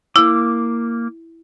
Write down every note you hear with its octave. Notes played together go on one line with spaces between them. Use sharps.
A#3 E4 D6